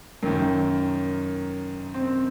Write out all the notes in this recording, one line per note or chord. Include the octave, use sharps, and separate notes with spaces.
F#2 D#3 A#3
C4